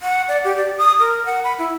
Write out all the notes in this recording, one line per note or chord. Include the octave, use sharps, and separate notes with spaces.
F#5
D5
G4
D5
D#6
A#4
F#5
B5
E4